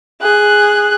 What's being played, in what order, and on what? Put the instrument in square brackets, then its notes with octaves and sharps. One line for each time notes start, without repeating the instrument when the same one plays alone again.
[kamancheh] G#4 F#6